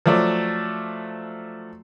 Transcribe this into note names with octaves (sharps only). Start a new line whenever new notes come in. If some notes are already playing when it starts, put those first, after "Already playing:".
F3 F#3 A3 D5